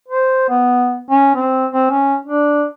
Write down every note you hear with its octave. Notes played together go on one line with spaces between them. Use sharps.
C5
B3
C#4
C4
C4
C#4
D4